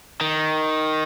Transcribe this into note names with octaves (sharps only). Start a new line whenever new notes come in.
D#3